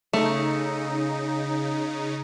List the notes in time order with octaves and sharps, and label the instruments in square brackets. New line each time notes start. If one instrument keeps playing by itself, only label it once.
[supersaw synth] C#3 D#4 [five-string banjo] A3